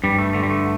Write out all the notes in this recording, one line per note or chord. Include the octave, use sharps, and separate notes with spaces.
G2 G3
A3
D3 A3
G3
A3